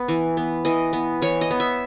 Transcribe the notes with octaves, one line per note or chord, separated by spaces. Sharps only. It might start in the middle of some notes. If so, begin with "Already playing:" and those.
Already playing: B3
E3
B3
E3 D#5
B3
E3 C#5
D#5
B3
E5